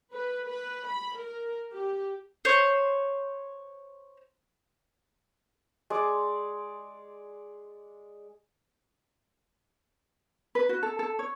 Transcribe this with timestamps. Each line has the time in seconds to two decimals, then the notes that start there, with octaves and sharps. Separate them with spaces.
0.13 B4
0.47 B4
0.86 B5
1.17 A#4
1.72 G4
2.45 C5 C#5
5.90 G#3 D5
10.55 B4
10.69 F#4
10.83 A4
10.99 A4
11.19 C#5